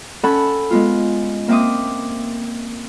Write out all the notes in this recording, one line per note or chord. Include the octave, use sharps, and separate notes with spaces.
C#4 A4 F#5 B5
G#3 B3 F4
A#3 C4 E5 D6 D#6